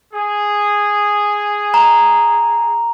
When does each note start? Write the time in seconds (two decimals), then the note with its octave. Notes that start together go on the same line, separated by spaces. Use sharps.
0.14 G#4
1.74 A#5